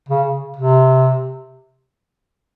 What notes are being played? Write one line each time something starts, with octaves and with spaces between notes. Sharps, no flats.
C#3
C3